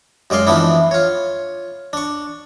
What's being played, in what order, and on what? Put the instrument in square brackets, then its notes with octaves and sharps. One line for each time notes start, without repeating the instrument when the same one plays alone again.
[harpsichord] F#2 G#3 D5 F5 C6
E3 F3 A3 B3 D4 E4
F4 C#5
D4 C#6